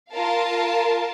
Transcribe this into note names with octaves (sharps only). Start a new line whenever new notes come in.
F4 A#4 F5 A5